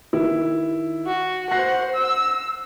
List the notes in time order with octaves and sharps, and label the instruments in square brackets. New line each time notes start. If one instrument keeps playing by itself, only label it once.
[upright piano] D#3 E4
[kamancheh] F#4
[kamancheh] C5 F#5 [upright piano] F#6 A#6 C7
[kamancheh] E6